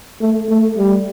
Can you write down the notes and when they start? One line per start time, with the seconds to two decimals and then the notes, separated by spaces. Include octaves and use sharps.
0.21 A3
0.49 A3
0.78 G3